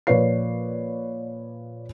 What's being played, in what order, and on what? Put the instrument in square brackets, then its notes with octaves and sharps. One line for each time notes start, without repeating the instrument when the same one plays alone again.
[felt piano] A#2 F3 B4 C#5 D5 C7